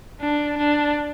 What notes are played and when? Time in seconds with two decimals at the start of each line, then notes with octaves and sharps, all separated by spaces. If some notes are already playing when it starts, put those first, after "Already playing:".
0.21 D4
0.58 D4